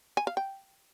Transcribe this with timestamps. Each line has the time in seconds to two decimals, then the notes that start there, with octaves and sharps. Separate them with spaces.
0.17 G#5
0.27 F5
0.37 G5